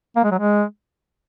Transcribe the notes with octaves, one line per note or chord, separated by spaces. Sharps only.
A#3
G#3
F#3
G#3